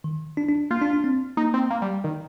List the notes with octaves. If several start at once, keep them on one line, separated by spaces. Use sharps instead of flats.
D#3
D4
D4
A#3 F4
D4
D4
C4
A#3 D#4
C4
A#3
G3
D#3